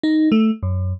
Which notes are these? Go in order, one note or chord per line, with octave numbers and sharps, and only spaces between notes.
D#4
A3
F#2